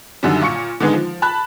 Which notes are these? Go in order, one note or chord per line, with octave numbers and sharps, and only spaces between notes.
F#2 D3 D#3 F#3 G3
A#2 F4 C#6 C#7
D3 D#3 G#3 B3 D#4
F3
A5 B5 F#6